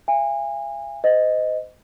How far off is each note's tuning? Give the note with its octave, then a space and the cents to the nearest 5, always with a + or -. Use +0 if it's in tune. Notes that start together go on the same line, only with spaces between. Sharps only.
F5 -45 G#5 -30
C5 -40 D#5 +0